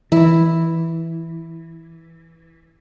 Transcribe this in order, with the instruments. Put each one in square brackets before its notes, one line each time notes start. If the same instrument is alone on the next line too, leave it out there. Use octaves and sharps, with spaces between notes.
[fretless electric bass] E3 [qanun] E4